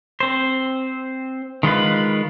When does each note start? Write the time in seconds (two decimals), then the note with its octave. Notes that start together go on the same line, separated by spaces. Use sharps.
0.20 C4 C5
1.63 D#3 G#3 F4 B4